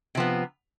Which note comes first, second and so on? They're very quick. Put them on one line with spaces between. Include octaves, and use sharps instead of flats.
C3 F3 B3